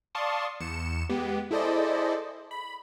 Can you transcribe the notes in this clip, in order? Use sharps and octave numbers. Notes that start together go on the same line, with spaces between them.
D5 F5 A5 C6 C#6 D#6
E2 C#7 E7
G#3 B3 G4
E4 G#4 A4 C5 D5 D#5
B5